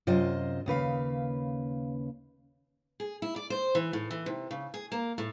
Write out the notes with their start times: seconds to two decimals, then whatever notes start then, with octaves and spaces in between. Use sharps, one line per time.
0.07 F#2 C3 F4 C5 D#5
0.66 D#2 C#3 B4 F5
3.00 G#4
3.22 E4
3.36 D5
3.50 C5
3.75 E3
3.93 A2
4.11 E3
4.26 C3
4.51 C#3
4.74 G#4
4.92 A#3
5.18 A2